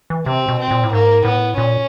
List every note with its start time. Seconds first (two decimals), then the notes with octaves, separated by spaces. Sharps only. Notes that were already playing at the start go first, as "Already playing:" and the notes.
0.10 E3
0.26 C3 C4
0.48 B2
0.60 C4
0.71 A#2
0.84 A2
0.93 G#2 A#3
1.25 A2 B3
1.58 A#2 C#4